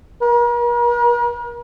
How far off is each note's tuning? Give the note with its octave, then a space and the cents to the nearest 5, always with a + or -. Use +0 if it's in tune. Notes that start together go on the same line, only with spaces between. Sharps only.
A#4 +45